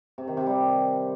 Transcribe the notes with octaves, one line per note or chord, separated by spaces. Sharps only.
C3
D#3
C3
G3